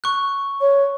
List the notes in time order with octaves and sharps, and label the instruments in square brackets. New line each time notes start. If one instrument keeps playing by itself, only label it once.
[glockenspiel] C#6 F#6
[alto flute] C#5